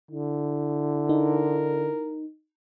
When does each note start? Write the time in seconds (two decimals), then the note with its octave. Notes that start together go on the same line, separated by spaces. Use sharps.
0.11 D3 E4
1.09 D#4 A#4